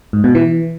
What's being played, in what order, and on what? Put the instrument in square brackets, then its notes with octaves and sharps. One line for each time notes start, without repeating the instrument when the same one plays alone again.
[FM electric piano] G#2
B2
E3